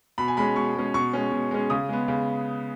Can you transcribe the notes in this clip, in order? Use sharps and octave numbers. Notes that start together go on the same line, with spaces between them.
B2 B5
G#5
G#3 C#4 B5
B2 C#6
G#3 C#4
B2 C#6
G#3 C#4
B2
G#3 C#4
C#3 D#6
G#3 B3
C#3